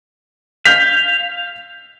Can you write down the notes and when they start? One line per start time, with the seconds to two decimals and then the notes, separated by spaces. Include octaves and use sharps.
0.65 F5 G6 B6